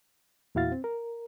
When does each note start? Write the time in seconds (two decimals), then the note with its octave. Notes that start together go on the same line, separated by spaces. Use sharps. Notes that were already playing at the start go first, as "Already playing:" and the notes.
0.55 E2 A#2 E4 F#4 F5 A6
0.72 C4
0.84 A#4